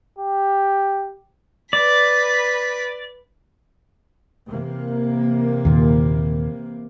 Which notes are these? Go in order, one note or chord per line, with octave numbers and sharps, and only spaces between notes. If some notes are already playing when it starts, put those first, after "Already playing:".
G4
B4 D5 B6
C3 E3 A#3
D#2 A#2